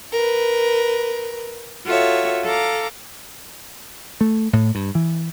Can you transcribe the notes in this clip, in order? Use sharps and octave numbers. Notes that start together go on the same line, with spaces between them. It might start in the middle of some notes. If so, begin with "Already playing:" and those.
A#4 B4
F4 F#4 A4 C#5 E5
A4 F5 A#5 D6
A3
A2
G2
E3